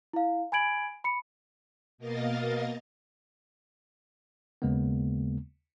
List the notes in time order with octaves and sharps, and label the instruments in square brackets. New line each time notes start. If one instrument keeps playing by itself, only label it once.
[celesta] E4 F5
G#5 B5 G#6 D7 F#7
B5 C#7
[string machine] B2 A#3 A#4 D#5 F5 A6
[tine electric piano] D#2 C#3 G#3 A#3 B3